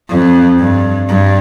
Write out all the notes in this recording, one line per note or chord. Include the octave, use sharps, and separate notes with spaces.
F2
G2
G2